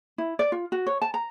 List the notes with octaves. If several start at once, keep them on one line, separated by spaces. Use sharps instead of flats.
E4
D5
F4
F#4
C#5
A5
A#5